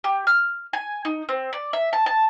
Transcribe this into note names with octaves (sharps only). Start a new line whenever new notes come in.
G4
F6
G#5
D#4
C4
D5
E5
A5
A5